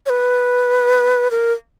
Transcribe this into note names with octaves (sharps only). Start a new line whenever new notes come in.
C#5
B4
A#4